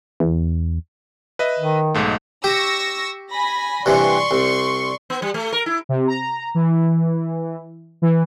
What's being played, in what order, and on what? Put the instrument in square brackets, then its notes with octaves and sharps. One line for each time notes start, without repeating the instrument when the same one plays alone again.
[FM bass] E2
[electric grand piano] B4 D#5 E5
[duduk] D#3
[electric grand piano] B1 G#2 A3
[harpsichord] G4 [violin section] C#6 E6 A#6
[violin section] G#5 B5 A#6
[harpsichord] G2 C3 E3 [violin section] D5 C6 C#6
[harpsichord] C2
[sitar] B3
G3
A3
A#4
E4
[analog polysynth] C3
A#5
E3
E3